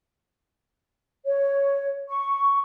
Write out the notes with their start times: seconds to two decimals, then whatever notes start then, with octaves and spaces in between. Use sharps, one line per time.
1.25 C#5
2.09 C#6